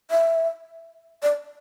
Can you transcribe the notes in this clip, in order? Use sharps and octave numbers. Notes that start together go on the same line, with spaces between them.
E5
D5